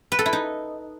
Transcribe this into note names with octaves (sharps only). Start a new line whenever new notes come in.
B4
A4
E4
D#4